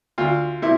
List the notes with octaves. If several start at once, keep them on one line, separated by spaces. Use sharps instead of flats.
D2 F4
C3 E4